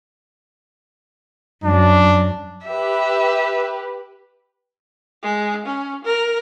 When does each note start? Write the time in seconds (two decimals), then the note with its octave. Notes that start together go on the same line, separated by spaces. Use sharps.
1.64 F#2 F#3 D4
2.67 G4 B4 E5
5.23 G#3
5.66 C#4
6.04 A#4